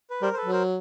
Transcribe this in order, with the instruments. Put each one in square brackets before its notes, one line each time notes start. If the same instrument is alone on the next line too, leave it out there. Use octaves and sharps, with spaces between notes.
[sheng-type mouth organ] B4
[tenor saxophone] G3 [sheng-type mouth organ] A#4 C5
[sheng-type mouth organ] C5
A4 B4
[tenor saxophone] F#3
[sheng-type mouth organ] A#4 C5